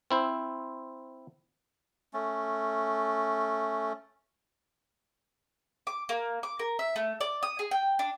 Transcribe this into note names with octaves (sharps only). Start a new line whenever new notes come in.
C4 E4 C5
A3 C#4
D6
A#3
D6
A#4
E5
A3
D5
D#6
G#4
G5
D4